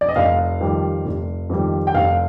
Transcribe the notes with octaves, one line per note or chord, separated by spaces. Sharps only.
D5
D#5
F1 F5
F2 D#3 G3
F1
F2 D#3 G3
G5
F1 F5